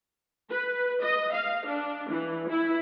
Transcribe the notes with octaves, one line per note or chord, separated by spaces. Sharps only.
B4
D#5
F5
D4
E3
E4